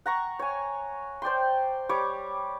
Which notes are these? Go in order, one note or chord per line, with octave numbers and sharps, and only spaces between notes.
F#5 A#5 C#6
C#5 G#5
C5 D5 G5 C6
G3 C#5 D6